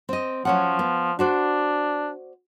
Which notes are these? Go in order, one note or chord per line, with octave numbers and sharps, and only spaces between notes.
C4 D#5
F3 F#3 C#4 F#5
B3
D4 F#4 C5 D5